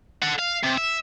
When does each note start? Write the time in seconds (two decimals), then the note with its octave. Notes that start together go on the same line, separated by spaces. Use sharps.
0.22 A4 F#5
0.39 F5
0.63 C3
0.77 E5